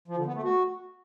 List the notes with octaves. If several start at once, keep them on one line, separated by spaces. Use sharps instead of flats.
F3
D3
B3
A3
F#4